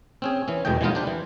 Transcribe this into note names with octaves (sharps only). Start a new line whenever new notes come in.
C4 C#4 G#4
E3 C#4
E2 B2 G#3 A3 D#5 G5
E3 G3 G#3 B3 D#4 F4
D4 G4 C5
E3